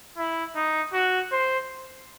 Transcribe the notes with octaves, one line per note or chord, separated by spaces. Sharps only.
E4
D#4
F#4
C5